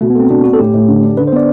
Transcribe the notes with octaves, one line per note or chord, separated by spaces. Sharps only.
B2 A3
B3
A3 C4
B2 D4
D4 F#4
A4
A2 G4
A2
D3
D4
D3 B4
C5
B3 D5